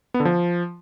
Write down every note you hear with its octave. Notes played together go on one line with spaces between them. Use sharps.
B3
D3
F3